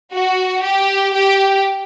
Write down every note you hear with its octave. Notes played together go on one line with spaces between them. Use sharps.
F#4
G4
G4